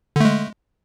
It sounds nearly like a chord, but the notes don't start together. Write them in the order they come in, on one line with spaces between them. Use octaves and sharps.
D3 A3 G#3